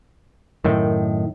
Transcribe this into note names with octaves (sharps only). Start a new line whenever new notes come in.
F#2 A2 D#3